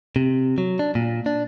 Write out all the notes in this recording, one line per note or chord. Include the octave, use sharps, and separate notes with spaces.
C3
F#3
D4
A#2
D4